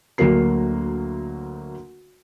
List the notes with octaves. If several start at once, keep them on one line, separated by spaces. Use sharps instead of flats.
D2 F#3 A#3 A#4 C7